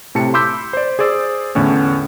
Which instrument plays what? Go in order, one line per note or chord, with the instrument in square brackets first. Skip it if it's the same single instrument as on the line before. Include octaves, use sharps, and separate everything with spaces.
[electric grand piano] A2 C3 A5 C#7
B5 C6 D6 E6 G6 B6
C5 D5
G#4 C5 D5 E6
E2 A2 D3 C#4